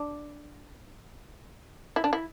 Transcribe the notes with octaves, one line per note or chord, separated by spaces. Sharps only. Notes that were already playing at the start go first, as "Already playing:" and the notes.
Already playing: D4
E4
D4
E4